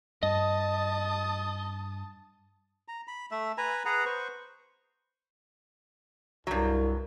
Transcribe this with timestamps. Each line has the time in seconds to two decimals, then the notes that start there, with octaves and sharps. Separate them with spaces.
0.23 G2 D#5 A5 D#6
2.88 A#5
3.08 B5
3.31 A3 E5
3.58 B4 G#5 A#5 B5
3.85 G#4 B4 F#5 A#5
4.06 B4 C5 C#6
6.47 C2 G2 F#3